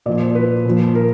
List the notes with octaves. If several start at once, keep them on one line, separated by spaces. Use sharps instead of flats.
A#2 F3 D5
C5
B4
A#2 F3
A#4